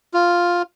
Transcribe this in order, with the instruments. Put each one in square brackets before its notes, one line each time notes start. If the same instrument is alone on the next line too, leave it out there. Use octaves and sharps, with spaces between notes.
[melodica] F4